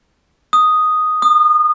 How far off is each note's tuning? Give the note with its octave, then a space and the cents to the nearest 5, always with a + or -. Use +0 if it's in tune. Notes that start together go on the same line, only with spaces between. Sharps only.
D#6 +0
D#6 -30